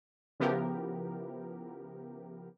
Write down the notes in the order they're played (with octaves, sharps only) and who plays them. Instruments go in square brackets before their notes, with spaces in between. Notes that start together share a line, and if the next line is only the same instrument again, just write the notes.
[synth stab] C#3 F3 B3 E4 G4 A#4